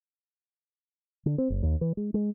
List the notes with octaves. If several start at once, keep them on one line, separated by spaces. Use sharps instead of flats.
D3
C4
F#1
D#2
E3
G#3
G#3